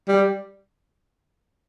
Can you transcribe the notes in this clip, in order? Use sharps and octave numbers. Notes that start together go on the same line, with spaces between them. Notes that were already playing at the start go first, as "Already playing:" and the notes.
G3